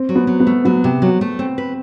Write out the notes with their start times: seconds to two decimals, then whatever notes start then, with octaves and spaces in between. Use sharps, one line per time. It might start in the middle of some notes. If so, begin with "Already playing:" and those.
Already playing: C4
0.09 F#3
0.15 B3
0.27 F#3
0.40 B3
0.47 A3
0.65 F#3 B3
0.84 C3
1.02 F#3
1.21 A3
1.39 C4
1.58 B4